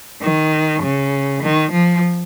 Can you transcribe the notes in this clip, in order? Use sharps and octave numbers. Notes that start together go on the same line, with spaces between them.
D#3
C#3
D#3
F3